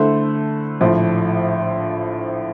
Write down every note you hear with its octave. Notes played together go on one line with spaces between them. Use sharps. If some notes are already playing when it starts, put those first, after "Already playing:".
Already playing: D3 A3 E4 A4 C5
A#1 A2 F3